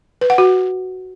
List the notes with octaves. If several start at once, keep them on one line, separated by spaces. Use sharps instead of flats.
B4
F#5
F#4